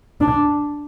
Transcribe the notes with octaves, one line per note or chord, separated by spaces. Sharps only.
D4